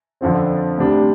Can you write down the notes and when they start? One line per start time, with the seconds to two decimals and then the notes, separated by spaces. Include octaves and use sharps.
0.21 F2 D3 F3 C4
0.77 D2 C3 G3 D4